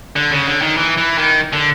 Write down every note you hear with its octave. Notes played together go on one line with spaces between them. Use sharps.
D3
C#3
D3
D#3
E3
E3
D#3
D3